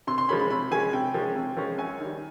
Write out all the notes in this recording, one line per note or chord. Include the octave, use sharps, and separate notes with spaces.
C3 C6
C6
F3 G#3 C#4 B5
B5
C3 B5
F3 G#3 C#4 G#5
C3 G5
F3 G#3 C#4
C3
F3 G#3 C#4
F#2 G#5
D#3 G3